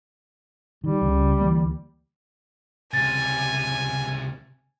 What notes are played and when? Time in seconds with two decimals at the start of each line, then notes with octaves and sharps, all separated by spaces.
0.84 D#3 G3
1.01 C#2 C#3
1.41 D2 E3 A#3
2.93 C#2 C3 G#5 A6